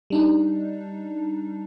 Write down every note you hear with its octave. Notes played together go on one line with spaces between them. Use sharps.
G3 D4 D#4